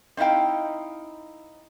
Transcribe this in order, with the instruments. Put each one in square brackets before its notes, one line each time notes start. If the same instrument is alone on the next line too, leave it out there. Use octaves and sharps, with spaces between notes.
[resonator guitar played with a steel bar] C4 D#4 E4 F5 G5